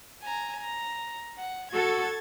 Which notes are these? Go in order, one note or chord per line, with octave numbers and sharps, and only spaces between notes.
G#5 A#5
A#5
F#5
F#4 A4 G#6 A6